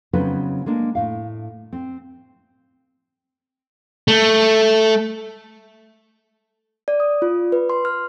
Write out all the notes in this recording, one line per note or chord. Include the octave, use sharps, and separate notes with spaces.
C#3 F#3 B3 C4 D#4 B4
G#3 A#3 D4
A2 F5
C4
A3
D5
D#6
F4
B4
C6
F6